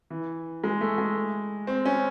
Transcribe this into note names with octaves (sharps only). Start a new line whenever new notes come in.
E3
G#3
A3
G#3
C4
C#4